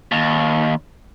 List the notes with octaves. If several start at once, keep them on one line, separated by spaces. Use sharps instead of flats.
D#2